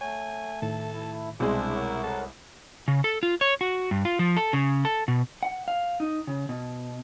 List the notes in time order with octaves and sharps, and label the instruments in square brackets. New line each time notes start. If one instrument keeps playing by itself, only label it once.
[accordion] A3 [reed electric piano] C#5 [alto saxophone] G#5
[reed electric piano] A2 D#3 [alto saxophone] A4
[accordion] A3 E4
[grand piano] C2 G#3 [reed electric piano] B2 C4 [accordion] D4 G#4 C5 [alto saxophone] E4
[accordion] A#4 C#5 F#5
[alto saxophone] A4
[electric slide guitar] C#3
A4
F4
C#5
F#4
G2
F4
F3
A4
C#3
A4
B2
F#5
F5
D#4
C#3
B2